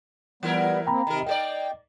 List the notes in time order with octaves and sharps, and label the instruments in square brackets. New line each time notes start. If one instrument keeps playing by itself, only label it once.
[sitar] E3 E4 A#4 [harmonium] G3 B3
[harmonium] A#3 C4 [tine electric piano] G5 A#5 B5
[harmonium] C3 [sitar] D#3 A#4
[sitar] A#3 A4 D5 [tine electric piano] D#5 [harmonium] G5